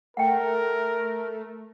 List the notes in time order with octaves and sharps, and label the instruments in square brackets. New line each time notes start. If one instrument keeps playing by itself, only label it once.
[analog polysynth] A3 [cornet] A#4 [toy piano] F#5 G5